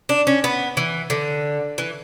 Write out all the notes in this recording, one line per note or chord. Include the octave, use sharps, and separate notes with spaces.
D4
C#4
B3
E3
D3
E3